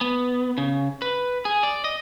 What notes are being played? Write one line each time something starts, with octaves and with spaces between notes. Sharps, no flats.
B3
C#3
B4
G#4
D5
D#5